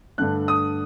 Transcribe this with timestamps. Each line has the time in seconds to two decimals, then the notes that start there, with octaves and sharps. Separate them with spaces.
0.18 G2 D3 A3 F#6
0.48 D#6